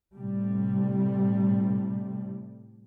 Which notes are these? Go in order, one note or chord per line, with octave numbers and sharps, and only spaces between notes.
A2 C3 G3